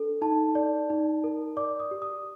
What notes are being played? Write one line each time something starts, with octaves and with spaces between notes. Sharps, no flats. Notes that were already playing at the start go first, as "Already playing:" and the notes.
Already playing: D4 A4
D#4 A5
D5
D#4
A#4
D5 D6
D#6
G4
D#6